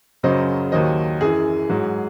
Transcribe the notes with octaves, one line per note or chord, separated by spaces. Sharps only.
F#2 C#3 F#3 C5 D#5
D#2 D#3 F#3 C5 D#5
F#2 E3 G#4
G#2 F#3